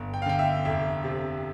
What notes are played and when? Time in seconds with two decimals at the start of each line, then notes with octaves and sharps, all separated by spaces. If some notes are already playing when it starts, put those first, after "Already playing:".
Already playing: G1
0.14 G5
0.22 F5
0.26 D3 G5
0.39 E5
0.65 F1 E5
1.04 C3